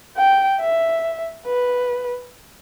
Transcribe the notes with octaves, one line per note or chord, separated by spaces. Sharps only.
G5
E5
B4